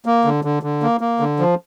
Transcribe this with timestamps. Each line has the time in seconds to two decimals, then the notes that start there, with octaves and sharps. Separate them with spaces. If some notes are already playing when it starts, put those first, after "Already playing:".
0.06 A#3
0.25 D3
0.44 D3
0.63 D3
0.82 A#3
1.01 A#3
1.20 D3
1.40 F3